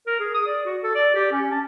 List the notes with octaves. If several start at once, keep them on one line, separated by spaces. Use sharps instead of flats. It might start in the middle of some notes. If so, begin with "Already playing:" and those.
A#4
G#4
D#6
D5
F#4
A4
D5
G4
C#4
A5